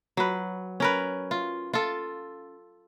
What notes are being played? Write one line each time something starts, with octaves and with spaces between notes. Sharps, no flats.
F#3 B4
C#4 A#4 B4
F4
F4 A4